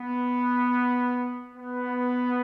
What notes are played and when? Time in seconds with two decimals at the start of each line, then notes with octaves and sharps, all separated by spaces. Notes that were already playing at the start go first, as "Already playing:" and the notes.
Already playing: B3
1.56 B3